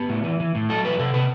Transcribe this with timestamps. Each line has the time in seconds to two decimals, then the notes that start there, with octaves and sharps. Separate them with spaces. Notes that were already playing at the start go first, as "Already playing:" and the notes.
Already playing: B3 G4
0.09 A2
0.24 E3
0.40 E3
0.55 A2
0.69 F#3 A4
0.84 E2 B4
0.99 C3 A4
1.14 C3 B4